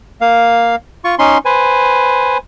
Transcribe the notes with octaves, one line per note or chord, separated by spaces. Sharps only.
A#3 F5
F4 C#6
C#4 D#4 C6
B4 C5 G#5